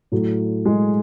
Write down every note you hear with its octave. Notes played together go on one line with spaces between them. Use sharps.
A2 F#3 A3
G#3 G#4